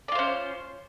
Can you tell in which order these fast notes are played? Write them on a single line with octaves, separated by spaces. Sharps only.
D5 F4 C5 C#4